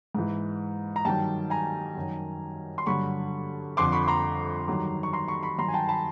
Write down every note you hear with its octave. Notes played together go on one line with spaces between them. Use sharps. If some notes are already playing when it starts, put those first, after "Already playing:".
G#2 E3
A#5
G2 D#3 F#3 G5 A5
G#5 A#5
F#2 D#3 F#3
C6
G2 D3 F#3 B5 C#6
F2 D3 F3 C6 D6
B5 C#6
A#5 C6
G2 D#3 F#3
C#6
A#5 C6
B5 C#6
B5 C#6
G2 D#3 F#3 A#5 C6
G#5
G5 A5
A5 B5